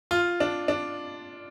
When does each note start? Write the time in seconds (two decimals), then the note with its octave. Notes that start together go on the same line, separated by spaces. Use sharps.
0.11 F4
0.40 D4
0.68 D4